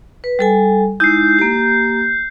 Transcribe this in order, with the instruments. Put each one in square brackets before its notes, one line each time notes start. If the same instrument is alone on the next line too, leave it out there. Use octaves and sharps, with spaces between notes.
[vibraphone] B4
G3 A4 G#5
[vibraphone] G#3 D#4 E4 [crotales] G6 C7
[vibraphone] A#3 G4